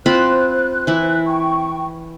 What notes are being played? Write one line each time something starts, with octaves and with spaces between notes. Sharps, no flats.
C4 F4 C5 B5 F#6
E3 E4
G5 C#6